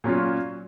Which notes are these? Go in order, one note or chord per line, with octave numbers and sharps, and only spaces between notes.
A#2 F#3 C#4 F4